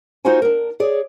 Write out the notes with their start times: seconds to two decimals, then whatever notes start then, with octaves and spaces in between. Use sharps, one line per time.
0.25 A#3 D#4 F4 F#4 C5 G#5
0.42 D4 A#4
0.80 G#4 C#5 D5